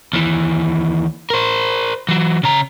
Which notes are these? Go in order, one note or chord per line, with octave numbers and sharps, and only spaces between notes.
D#2 E3
A#4 C5
E3 F#3
C#3 A#5